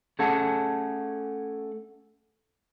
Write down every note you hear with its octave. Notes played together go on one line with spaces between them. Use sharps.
A3 C#4 G#4 A4 F#5 A5